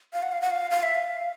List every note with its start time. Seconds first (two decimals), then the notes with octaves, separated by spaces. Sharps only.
0.13 F5
0.23 F#5
0.32 F5
0.42 F#5
0.50 F5
0.71 F5
0.83 E5
0.95 F5